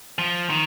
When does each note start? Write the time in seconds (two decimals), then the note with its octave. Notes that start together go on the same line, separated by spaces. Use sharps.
0.19 F3
0.50 D#3